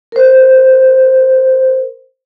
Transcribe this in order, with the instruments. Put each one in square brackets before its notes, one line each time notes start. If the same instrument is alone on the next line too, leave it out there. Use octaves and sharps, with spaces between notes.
[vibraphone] A#4 C5